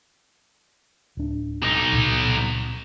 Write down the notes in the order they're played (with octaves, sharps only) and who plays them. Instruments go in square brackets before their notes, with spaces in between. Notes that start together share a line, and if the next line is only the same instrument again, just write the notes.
[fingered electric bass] D1 D4
[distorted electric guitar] B1 D#4
[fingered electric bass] C#2 A#2